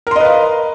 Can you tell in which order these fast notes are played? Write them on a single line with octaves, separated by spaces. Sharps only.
A#4 C6 D#5 B4 F5